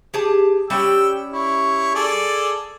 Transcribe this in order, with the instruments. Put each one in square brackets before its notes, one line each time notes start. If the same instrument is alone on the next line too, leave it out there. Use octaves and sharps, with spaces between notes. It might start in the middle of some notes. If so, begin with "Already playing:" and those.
[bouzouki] G4 G#4 A5
[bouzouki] G3 C#4 F#5 [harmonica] G5 E6
[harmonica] E4 C#5
G#4 A4 D5